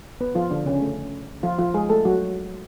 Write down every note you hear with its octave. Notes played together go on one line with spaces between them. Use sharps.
B3 B4
F3 F4
D3 D4
C#3 C#4
A3
F3 F4
F3 F4
G#3 G#4
A3 A4
F#3 F#4